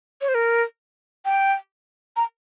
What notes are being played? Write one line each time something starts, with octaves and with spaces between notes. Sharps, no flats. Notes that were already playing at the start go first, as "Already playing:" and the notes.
C#5
C5
A#4
G5
A#5